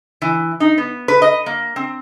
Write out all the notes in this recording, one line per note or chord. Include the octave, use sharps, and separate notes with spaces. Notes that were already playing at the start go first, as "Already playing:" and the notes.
E3
D#4
B3
B4
D#5
A#3
C4